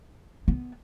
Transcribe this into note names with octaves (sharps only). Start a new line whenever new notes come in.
B3